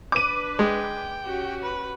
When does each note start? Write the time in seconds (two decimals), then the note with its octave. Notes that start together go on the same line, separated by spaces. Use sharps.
0.12 D4 B4 D6 D#7
0.59 G#3 G5
1.24 C#4 F#4 G4
1.63 B4